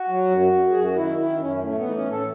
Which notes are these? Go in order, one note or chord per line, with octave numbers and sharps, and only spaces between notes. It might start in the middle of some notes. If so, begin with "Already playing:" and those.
Already playing: F#4
F#3
F#2
F#2
F#2 G#4
F#4
D#3 E4
D#3 E4
F#2 C#4
A2 A3
B3
E3 D#4
C#4
A2
A4